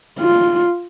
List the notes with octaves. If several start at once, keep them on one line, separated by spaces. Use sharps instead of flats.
F4